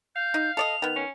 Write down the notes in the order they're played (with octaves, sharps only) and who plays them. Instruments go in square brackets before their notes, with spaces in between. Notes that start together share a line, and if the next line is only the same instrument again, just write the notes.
[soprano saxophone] F5 [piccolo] G6
[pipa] D#4
[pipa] A4 D5 D#5 [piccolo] F7
[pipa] D#3 B3
[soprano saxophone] C#4